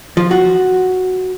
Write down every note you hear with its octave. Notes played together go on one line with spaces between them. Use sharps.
F3
F#4